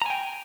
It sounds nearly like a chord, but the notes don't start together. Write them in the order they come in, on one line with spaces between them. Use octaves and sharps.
A#5 G#5 G5